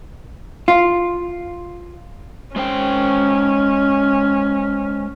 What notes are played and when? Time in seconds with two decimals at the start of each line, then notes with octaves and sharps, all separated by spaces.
0.68 F4
2.56 G#3 C#4 C5 G5